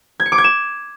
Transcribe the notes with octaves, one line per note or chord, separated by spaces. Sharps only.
G#6
C#7
D6
G#6
E7